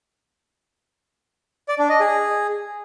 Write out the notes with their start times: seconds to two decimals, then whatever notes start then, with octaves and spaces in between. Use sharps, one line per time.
1.68 D5
1.79 D4
1.89 D#5
2.00 G#4